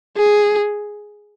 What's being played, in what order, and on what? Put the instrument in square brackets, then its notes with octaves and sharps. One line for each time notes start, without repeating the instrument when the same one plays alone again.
[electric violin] G#4